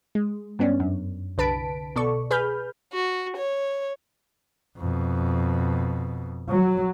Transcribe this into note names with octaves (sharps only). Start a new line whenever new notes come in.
G#3
G2 B3 C#4 D4
F#2
C2 D3 B4 A5 B6 D7
B2 A4 D5 C#6
G#4 B4 B5 F6 G6
F#4
C#5
F2 B2
F#3